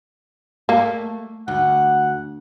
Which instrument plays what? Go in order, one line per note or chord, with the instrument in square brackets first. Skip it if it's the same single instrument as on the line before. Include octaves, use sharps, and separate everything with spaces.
[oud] A3 [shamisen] A#3
[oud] D2 [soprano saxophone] F#5